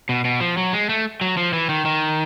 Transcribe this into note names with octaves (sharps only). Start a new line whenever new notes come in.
B2
B2
F3
F#3
G#3
A3
F#3
F3
E3
D#3
D#3